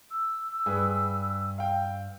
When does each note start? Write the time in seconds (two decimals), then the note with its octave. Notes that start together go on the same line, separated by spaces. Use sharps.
0.11 E6
0.66 G2 G#4 B4
1.58 F5 G5